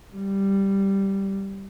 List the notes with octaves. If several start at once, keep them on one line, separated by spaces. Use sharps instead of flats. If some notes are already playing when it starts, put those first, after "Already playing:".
G3